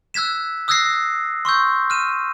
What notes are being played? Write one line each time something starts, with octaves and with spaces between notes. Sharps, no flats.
E6 F#6 G#6 B6 E7
D#6 E6 F#6 G#6 A#6 C7
C6 C#6 E6 G6
F6 D#7 E7